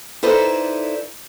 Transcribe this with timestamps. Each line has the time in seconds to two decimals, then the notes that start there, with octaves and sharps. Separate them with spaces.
0.23 D#4 E4 A4 B4 C5 D5